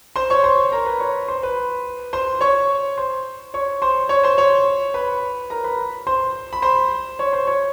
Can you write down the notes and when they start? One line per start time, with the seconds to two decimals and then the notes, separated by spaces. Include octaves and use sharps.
0.16 C5 C6
0.30 C#5 C#6
0.44 C5 C6
0.72 A#4 A#5
0.86 B4 B5
1.00 C#5 C#6
1.28 C5 C6
1.43 B4 B5
2.13 C5 C6
2.41 C#5 C#6
2.98 C5 C6
3.54 C#5 C#6
3.82 C5 C6
4.09 C#5 C#6
4.24 C5 C6
4.38 C#5 C#6
4.94 B4 B5
5.50 A#4 A#5
5.64 B4 B5
6.07 C5 C6
6.53 B5
6.62 C5 C6
7.19 C#5 C#6
7.33 C5 C6
7.47 C#5 C#6